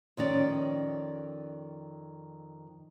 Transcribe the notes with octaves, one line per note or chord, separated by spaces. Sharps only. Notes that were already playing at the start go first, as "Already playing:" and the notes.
F2 D#3 C#4 D5